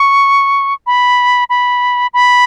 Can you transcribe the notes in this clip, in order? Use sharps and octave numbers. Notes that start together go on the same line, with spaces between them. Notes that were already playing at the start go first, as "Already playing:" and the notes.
Already playing: C#6
B5
B5
B5